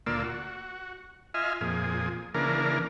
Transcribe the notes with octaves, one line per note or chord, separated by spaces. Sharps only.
D2 A#2 A#3 F4 D5 E6
F#4
F4 D#5 E5 G#5 F6
F2 A#2 G#4
C#3 E3 A#3 D4 A#4